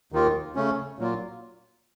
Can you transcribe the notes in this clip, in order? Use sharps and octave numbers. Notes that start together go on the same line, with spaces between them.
D#2 D#3 A#3 F4
C#3 A3 C#4
A#2 F#3 A#3 F4